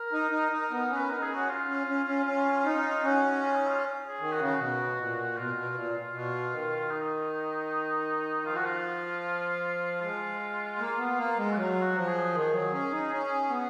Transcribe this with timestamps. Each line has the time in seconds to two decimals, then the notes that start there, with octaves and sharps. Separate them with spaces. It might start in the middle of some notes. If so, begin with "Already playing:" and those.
Already playing: A#4
0.13 D#4
0.32 D#4
0.52 D#4
0.71 B3
0.90 C#4
0.96 B4
1.09 D#4 A#4
1.20 D#4 G#4
1.30 C#4
1.35 F#4
1.49 F4
1.68 C#4
1.87 C#4
2.06 C#4
2.26 C#4
2.65 D#4
3.03 C#4 F#4
3.42 F4
3.55 D#4
3.68 F4
4.07 G#4
4.20 D#3
4.32 F#4
4.39 C#3
4.59 B2
4.97 A#2
5.35 B2 F4
5.55 B2
5.75 A#2
6.13 B2
6.52 D#3
6.91 D#4
8.46 F3 F4
8.56 F#4
8.65 F4
10.01 G#3 F4
10.79 A#3
10.98 B3
11.17 A#3
11.37 G#3
11.51 F#4
11.55 F#3 F4
11.81 F#4
11.95 F3
12.00 F#4
12.08 G#4
12.33 D#3 G#4
12.52 F#3
12.72 C#4
12.91 D#4
13.11 C#4
13.49 B3